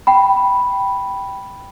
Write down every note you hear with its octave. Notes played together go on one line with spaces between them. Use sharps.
G5 B5